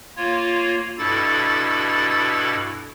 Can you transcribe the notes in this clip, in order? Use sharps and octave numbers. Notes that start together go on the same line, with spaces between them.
A#3 F4 C#5
G2 B2 E4 A4 A6